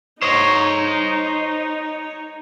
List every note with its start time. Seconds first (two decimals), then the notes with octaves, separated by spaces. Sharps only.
0.22 D#4 C5 C#5 D#5